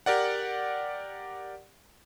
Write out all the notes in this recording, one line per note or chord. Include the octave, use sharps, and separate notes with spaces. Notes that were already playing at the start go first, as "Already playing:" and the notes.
G4 A#4 D5 F#5